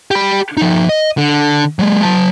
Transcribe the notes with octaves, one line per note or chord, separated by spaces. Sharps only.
G4 B5
F3 D#4
D#5
D3
F#3 G#3
F#3 A5